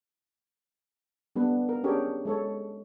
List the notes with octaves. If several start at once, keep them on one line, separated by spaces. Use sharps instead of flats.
G3 B3 D4 B4
A#4
C#4 D4 G4 G#4 A#4 C#5
G#3 A4 C#5